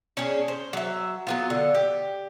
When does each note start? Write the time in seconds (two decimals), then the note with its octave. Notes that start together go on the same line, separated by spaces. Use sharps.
0.17 C#4 D4 G#4
0.48 C5
0.73 F#3 E5
1.27 F#3 B3 F4
1.50 D3
1.75 G4